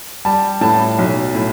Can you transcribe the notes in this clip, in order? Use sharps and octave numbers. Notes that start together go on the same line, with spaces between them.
G3 A5
A2 A5
B1
A2